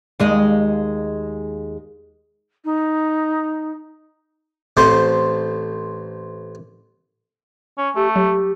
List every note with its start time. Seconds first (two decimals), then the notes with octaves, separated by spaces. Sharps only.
0.20 D#2 G#3 D#5
2.64 D#4
4.77 A1 A3 C4 C5 A5 C6
7.78 C#4
7.96 A3 G4
8.16 F#3 G4